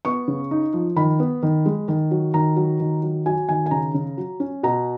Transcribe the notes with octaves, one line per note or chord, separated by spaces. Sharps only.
B3 C#6
C#3
D#4
F3
D#3 B5
B3
D#3
G#3
D#3
F#3
D#3 A#5
F#3
D#3
F#3
F#3 G#5
D#3 G#5
G#5
C#3 A#5
C#3
F#3
C#4
B2 A#5